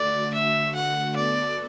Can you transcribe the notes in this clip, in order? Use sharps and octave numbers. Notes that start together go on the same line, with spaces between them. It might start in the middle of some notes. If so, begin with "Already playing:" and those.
Already playing: D3 A3 F#4 D5
E5
F#5
B3 F#4 A4 D5